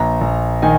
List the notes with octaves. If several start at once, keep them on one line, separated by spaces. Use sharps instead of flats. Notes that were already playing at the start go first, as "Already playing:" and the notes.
Already playing: A#1 A#5
A#1
D#3 G#5